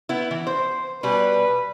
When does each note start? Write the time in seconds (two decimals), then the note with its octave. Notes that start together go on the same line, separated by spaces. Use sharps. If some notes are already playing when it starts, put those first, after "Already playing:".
0.09 B3 E4
0.31 E3
0.47 C5
1.03 B2 G3 B4 G#5